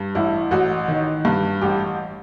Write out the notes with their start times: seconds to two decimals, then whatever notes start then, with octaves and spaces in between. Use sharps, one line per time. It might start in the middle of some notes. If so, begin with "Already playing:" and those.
Already playing: G2
0.15 A1 E4
0.51 A1 F#4
0.88 D#3
1.25 G2
1.62 A1 G4